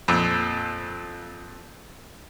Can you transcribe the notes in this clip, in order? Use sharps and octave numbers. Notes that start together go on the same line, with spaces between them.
F2 A#2